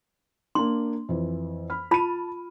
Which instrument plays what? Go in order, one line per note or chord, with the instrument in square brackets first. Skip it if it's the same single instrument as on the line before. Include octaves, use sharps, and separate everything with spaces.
[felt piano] A#3 D4 [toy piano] C6
[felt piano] F2 E3
B5 F6
[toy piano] F4 B5 [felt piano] A5 D#7